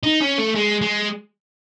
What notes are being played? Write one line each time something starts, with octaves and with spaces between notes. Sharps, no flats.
D#4
C#4
A3
G#3
G#3